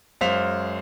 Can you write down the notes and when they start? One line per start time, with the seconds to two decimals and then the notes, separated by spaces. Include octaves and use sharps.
0.21 F#2 G#3 C5 F5 B6 F7